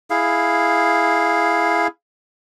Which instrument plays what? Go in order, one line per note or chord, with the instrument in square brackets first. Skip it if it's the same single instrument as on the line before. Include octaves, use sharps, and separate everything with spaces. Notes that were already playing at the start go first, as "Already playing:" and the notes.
[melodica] E4 G#4 F5